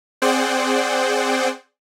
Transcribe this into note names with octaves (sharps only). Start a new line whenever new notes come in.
C4 G#4 C5 D5 F#5 G5